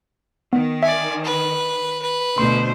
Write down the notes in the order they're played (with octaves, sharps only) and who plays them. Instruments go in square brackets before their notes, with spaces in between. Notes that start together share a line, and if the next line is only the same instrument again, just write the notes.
[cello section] D#3 [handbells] B3
[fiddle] D5 G#5 [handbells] E5
[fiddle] B4
B4
[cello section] D2 B2 C5 [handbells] C6